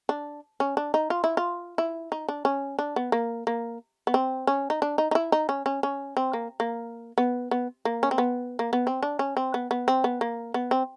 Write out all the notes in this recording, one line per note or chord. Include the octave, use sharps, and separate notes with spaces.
D4
C#4
D4
D#4
F4
E4
F4
E4
D#4
D4
C#4
D4
B3
A#3
A#3
B3
C4
C#4
D#4
D4
D#4
D#4
E4
D#4
C#4
C#4
C#4
C4
A#3
A#3
B3
B3
A#3
C#4
C4
B3
A#3
B3
C4
D4
C#4
C4
B3
B3
C4
B3
A#3
B3
C4